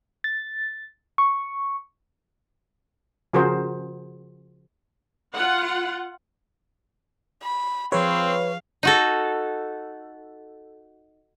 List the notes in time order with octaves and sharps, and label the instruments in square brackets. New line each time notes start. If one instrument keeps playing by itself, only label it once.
[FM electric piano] A6
C#6
[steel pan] C#3 F3 F#4 G#4 A#4 C5
[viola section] F4 F#5
[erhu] B5
[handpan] F3 G#4 [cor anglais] C4 [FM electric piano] B4 C#5 [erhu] F5
[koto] D#4 F#4 A4